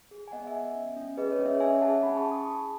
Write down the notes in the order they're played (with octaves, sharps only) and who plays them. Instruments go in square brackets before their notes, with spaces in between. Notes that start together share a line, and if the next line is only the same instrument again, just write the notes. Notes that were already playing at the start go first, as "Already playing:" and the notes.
[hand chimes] G#4
G#5
B3 D#5 F#5
E5 G#5
B3
C#4
C#4
G#4 B4 D#5
C#5
C#4
C#5 E5
C#4 E5 G#5
G#4 F#5 A5
C#4 G#5 B5
A5 C#6
G#4
B5 D#6
E4 B5 D#6